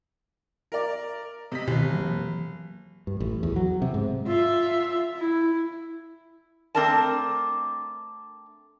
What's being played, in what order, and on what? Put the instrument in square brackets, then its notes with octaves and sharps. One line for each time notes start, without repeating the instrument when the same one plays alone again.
[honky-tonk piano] A#4 D5
C3 D#5 B6
[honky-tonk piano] F1 [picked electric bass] B2 D#3
[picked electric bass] E3 F#3 A#3
[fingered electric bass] G2
A1
E2
F#3
C3
G#2
[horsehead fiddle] F4 E5
E4
[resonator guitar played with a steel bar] A3 C4 D4 A#4 D5 A5